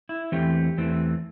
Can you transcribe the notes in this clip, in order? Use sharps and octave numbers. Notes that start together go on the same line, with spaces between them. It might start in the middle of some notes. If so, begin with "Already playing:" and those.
E4
E2 E3 A3 C4 G4
E2 E3 A3 C4